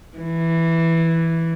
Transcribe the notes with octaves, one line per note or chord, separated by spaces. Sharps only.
E3